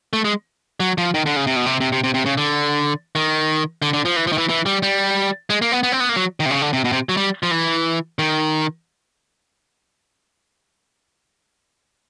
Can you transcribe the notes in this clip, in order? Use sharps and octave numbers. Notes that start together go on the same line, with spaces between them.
A3
G#3
F#3
F3
D#3
D3
C#3
C3
B2
C3
C3
C3
C3
C3
C#3
D3
D#3
D3
D3
F3
E3
F3
D#3
E3
E3
G3
G3
G#3
A#3
B3
B3
C4
B3
A#3
F#3
D#3
C3
C#3
D3
C3
B2
C3
F#3
G3
F3
E3
D#3